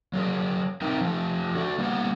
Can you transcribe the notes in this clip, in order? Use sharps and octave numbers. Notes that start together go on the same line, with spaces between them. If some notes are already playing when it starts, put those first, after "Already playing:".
F#3 G#4 A#4
C4 D#4 A#4 E5 G5
F3 A3
D4 F#4
G3 A#3 B3 F#5